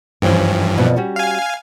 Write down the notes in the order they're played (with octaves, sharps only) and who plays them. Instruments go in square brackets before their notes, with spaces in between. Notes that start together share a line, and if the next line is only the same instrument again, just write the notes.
[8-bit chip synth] G2 E3 F3 [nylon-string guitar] C#4 C5 G5
[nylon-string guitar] F2 B2 D5
G3 C#4 F#4
[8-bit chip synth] F5 G#5